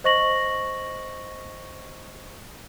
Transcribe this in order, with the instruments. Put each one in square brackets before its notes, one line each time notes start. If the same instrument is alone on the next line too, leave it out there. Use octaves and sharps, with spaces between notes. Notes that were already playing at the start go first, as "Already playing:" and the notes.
[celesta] C5 D#5 C#6 A#6 F#7